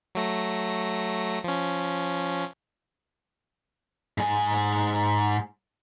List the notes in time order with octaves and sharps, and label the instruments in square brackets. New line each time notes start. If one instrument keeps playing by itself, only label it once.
[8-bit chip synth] F#3 A3 A#6
F3 C#4
[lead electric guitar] G#2 G#5